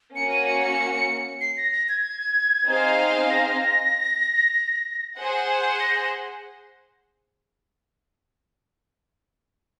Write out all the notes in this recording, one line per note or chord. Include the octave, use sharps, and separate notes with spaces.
A#3 C#4 F#4 C#7
D#7
C#7
C#7
C7
A#6
A#6
G#6
C4 D#4 G#4 C5 F5
A#6
G#4 C5 F#5
A#6